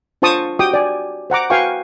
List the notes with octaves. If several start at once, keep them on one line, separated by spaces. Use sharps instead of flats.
D4 F4 C5 A5 C#6 D#6
F#4 G4 G5 D6 D#6
D5 G#5
C5 F#5 A#5 D6
F#4 B4 F5 G5 G#5 C#6